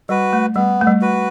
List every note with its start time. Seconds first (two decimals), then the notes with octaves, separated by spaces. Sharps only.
0.09 G3 F#4 B4
0.33 A3
0.55 G3 B3
0.81 A3
0.87 G3
1.01 F#4 B4